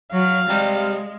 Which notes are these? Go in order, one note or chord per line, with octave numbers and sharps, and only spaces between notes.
F#3 F5
C3 G3 G#3